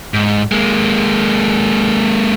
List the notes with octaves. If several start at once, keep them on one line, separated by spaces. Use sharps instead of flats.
G#2
G#3 A#3